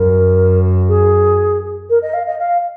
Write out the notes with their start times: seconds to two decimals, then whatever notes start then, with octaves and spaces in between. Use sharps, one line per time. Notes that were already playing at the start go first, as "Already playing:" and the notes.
Already playing: F#2 A#4
0.88 G#4
1.90 A#4
2.02 D#5
2.13 F5
2.27 D#5
2.39 F5